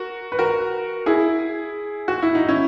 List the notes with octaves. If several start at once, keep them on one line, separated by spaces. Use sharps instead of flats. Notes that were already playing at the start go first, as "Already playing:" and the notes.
Already playing: F#4 A#4
B4
F#4 A#4
E4 G#4
F#4
E4
D#4
C#4 E4